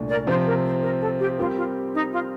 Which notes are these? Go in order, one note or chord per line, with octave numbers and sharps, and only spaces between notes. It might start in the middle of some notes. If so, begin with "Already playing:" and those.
Already playing: C2 A#2 A3 D4
A#4 D5
C3 F3 C4 C5
A#4
C5
A#4
A4
G4
G3 C4 F4 G4 A#4
F4
D#4
F4